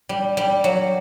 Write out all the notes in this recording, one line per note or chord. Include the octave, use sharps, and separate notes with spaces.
G3
G3
F#3